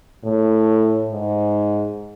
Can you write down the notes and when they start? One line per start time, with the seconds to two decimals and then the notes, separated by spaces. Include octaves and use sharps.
0.24 A2
1.10 G#2